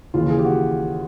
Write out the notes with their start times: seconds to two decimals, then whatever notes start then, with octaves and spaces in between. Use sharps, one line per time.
0.14 D#2 C#3 E3 F4
0.30 G#4
0.38 G4
0.45 F#4